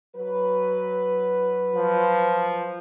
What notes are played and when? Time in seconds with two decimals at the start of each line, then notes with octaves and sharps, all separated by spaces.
0.16 F#3 B4
1.76 F3